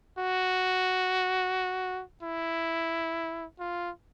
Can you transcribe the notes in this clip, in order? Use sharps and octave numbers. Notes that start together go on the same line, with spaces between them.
F#4
E4
F4